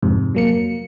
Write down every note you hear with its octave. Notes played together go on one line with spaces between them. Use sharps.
F2 G#2 C3
F#3 A#3 C#7